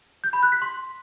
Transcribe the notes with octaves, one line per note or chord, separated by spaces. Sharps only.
G6
B5
F#6
B6
C6